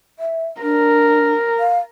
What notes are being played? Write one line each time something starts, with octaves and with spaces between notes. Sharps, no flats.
E5
D4 A#4
F5